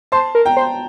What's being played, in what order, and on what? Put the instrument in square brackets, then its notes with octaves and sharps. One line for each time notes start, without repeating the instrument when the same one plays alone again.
[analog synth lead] C5 [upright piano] A5 C6
[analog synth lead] A#4
[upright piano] G5 A#5
[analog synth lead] C5